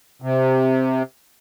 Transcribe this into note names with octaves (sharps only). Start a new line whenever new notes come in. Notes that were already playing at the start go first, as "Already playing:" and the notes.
C3